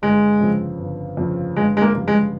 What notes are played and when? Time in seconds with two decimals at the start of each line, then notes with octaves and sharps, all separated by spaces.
0.02 G1 G#3
0.41 F2 C#3 F3 C4
0.79 G1
1.17 F2 C#3 F3 C4
1.56 G1 G#3
1.77 G#3
1.81 A#3
1.94 F2 C#3 G3
2.08 G#3